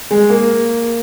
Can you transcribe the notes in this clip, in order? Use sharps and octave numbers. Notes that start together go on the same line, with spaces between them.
G#3
A#3